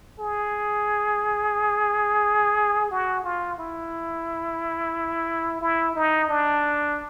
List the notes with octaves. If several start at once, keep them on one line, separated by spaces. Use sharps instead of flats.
G#4
F#4
F4
E4
E4
D#4
D4